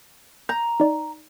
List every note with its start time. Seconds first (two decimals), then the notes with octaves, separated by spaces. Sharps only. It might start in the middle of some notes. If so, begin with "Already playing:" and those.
0.49 A#5 G6
0.80 D#4 D5